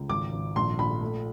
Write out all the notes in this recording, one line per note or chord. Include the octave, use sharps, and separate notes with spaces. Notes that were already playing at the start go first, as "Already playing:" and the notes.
Already playing: C#2
G#1 D6
G#1
A#1 C6
A#1 B5
A3